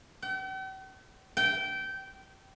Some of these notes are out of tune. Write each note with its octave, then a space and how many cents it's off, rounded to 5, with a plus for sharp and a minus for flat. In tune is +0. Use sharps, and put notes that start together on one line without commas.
G5 -45
G5 -20